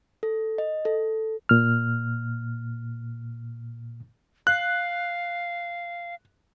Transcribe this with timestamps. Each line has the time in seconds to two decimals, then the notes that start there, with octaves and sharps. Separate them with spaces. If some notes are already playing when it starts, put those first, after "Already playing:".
0.23 A4
0.58 D#5
0.85 A4
1.49 A#2 F6
4.47 F5 F#6